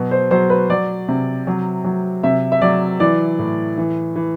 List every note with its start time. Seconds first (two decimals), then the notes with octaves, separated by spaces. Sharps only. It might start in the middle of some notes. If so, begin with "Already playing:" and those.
Already playing: B2 F#3
0.11 C5
0.31 F#3 C5
0.50 B4
0.70 F#3 D5
1.08 C3
1.47 F#3
1.84 F#3
2.23 C3 E5
2.52 E5
2.62 F#3 D5
3.00 E3 D5
3.39 A2
3.78 E3
4.16 E3